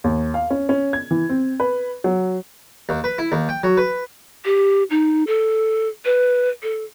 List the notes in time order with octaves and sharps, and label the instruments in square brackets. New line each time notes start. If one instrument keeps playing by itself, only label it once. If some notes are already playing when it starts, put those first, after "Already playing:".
[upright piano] D#2
F5
C#4
C#4
G#6
E3
C4
B4
F#3
[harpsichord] D#2
B4
E4
D#2
G5
F#3
B4
[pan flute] G4
D#4
A4
B4
A4